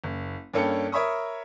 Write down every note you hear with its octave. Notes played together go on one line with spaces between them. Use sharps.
F#1
G2 A#3 C#4 A4 G5 C#7
A#4 C#5 E5 B5 C#6 D#6